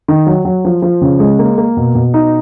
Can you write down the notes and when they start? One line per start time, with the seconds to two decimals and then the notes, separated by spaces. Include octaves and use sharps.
0.08 D#3
0.27 F#3
0.45 F#3
0.65 F3
0.82 F3
1.02 C#3
1.20 G#3
1.39 A#3
1.58 A#3
1.77 B2
1.95 B2
2.14 D#4